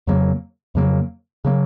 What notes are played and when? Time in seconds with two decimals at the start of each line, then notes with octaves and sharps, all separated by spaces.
0.07 F2 C#3 F#3 A#3
0.75 F2 C#3 F#3 A#3
1.45 C#3 F#3 A#3